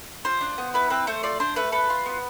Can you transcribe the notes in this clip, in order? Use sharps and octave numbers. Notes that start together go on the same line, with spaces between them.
F4 C5
D4
B3
E4 B4
C4 B4
A3 C5
F4 D5
D4 C5
A3 B4
A4 B4
F4
B3